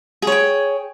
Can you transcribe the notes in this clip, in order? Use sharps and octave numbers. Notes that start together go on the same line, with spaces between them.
G#4 C#5 G5